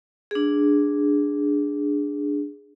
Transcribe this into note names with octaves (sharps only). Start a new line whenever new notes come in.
D4 G#4